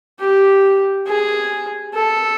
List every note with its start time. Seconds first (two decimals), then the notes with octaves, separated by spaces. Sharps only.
0.20 G4
1.07 G#4
1.94 A4